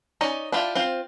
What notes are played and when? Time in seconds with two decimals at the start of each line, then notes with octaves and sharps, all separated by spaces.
0.21 C#4 D#4 D5 D#5
0.52 D4 E4 F4 G4
0.75 C4 F4 C5